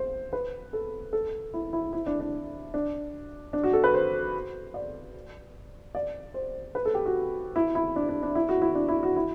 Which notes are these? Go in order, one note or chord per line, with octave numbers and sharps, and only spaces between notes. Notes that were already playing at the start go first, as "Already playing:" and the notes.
Already playing: C5
B4
A4
A4
E4
E4
E4
D4
D4
D4
D4
F#4
A4
B4
C5
D5
D5
C5
B4
A4
G4
F#4
E4
E4
D4
D4
D4
E4
F#4
E4
D4
E4
F#4
E4